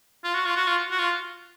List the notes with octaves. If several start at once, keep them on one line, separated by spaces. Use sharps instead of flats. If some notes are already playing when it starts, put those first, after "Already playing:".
F4
F#4
F4
F#4
F4
F#4
F4